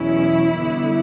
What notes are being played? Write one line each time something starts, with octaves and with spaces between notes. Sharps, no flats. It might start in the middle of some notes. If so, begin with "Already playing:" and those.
Already playing: E2 B2 F#3 C#4 E4
F#2 D3 G3 B3